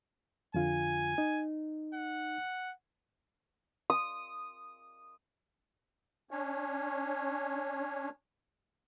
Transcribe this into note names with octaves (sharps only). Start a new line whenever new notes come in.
F2 D3 F4 G#5
D#4
F#5
D#6
C#4 D4 C#5